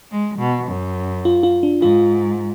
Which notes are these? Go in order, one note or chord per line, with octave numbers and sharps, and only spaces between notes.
G#3
B2
F#2
F4
F4
D4
G#2 F4